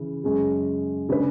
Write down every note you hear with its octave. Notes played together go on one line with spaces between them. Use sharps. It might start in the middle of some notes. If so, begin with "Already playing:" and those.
Already playing: C#3 E3
F#2 C#3 G#3 C#4 G#4
C#3 G#3 D4 G#4 B4